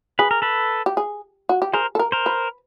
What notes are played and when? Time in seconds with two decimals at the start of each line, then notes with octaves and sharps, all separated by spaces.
0.19 G#4 B4
0.31 A#4
0.42 A4 B4
0.86 G4
0.97 G#4
1.49 F#4
1.62 G4
1.73 G#4 A#4 C5
1.95 A4
1.99 A#4
2.12 A#4 C5
2.26 B4